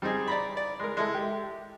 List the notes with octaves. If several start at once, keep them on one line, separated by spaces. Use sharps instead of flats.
G3 C4 D#4 G#4
D5 A#5 B5
D5
G#3 A#4
G#3 E4 A4
G4